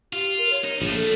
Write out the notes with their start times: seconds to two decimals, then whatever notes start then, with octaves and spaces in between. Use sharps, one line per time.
0.13 F4 G4
0.38 A#4
0.50 C#5
0.64 D#4
0.82 A#1 F3 A3 A#3
0.94 A4